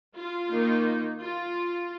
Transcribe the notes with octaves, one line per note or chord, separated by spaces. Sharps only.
F4
D#3 A#3 D#4
F4